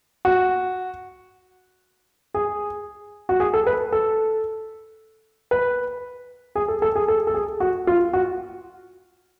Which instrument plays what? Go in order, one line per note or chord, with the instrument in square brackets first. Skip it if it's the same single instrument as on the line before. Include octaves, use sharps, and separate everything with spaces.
[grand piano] F#4
G#4
F#4
G#4
A4
B4
A4
B4
G#4
A4
A4
G#4
A4
A4
G#4
F#4
F4
F#4